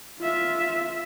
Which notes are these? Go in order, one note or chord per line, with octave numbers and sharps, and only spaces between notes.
F4 E5